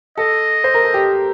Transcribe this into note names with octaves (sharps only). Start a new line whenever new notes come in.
A4 D#5
C5
A#4
A4
G4